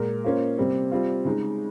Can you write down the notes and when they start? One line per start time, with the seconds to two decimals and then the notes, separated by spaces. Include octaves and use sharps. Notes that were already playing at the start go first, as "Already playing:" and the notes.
Already playing: A#2 G#3 A#4
0.24 A#3 C#4 F4 C5
0.58 C3 G3 C4
0.92 G3 C4 F4
1.25 C#3 G#3 D#4